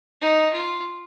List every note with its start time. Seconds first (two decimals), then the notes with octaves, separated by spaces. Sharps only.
0.22 D#4
0.53 F4